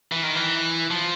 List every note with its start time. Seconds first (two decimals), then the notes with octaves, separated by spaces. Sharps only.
0.12 E3
0.23 D#3
0.35 E3
0.91 F3